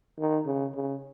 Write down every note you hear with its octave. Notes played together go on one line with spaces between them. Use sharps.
D#3
C#3
C#3